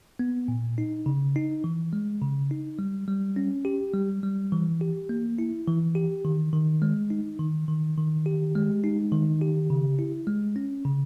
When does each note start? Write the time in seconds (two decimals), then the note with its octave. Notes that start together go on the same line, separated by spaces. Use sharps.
0.19 B3
0.48 A#2
0.78 D#4
1.06 C#3
1.36 D#4
1.64 E3
1.93 G#3
2.22 C#3
2.51 D#4
2.79 G3
3.08 G3
3.36 C#4
3.65 G4
3.94 G3
4.23 G3
4.52 E3
4.81 G4
5.09 A#3
5.39 E4
5.68 E3
5.95 G4
6.25 D#3
6.53 D#3
6.82 G#3
7.10 D#4
7.39 D#3
7.68 D#3
7.98 D#3
8.26 G4
8.55 G#3
8.84 D#4
9.12 D#3
9.41 G4
9.70 C#3
9.99 E4
10.27 G#3
10.56 C#4
10.85 C#3